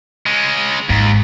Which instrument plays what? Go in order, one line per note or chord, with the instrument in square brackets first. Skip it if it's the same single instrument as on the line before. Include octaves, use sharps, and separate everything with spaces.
[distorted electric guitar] G#3 C#4
[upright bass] G#1 G#2 [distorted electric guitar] D#2